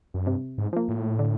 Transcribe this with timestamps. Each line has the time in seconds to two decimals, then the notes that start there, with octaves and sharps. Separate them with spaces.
0.14 F#2
0.26 G2 C3
0.58 G#2
0.73 F3 A#3
0.88 A2
1.19 D3